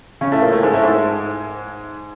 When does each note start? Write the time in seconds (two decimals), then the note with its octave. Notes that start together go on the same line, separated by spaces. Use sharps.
0.21 C#3 C#4
0.32 A2 A3
0.42 A#2 A#3
0.52 A2 A3
0.63 G#2 G#3
0.73 A2 A3
0.83 G#2 G#3